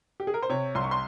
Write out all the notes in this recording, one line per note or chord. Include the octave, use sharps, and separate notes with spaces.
G4
G#4
A#4
C5
C3 C#5
C2 C6
C#6
C6